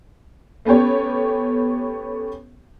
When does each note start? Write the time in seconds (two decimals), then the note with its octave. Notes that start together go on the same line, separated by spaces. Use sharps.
0.65 A3 B3 C#4 G4 C#5